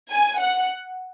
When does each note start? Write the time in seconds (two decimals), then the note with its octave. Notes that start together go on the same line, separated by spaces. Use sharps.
0.12 G#5
0.40 F#5